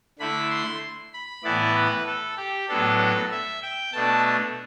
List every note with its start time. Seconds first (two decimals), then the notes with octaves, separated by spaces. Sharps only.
0.19 D3 A3 E4 B5
0.50 C6
1.13 B5
1.44 A2 E3 B3 E4 D5
1.75 B4
2.06 A4
2.37 G4
2.68 A2 F#3 B3 D4 A4
3.31 E5
3.62 G5
3.93 B2 A3 D4 A5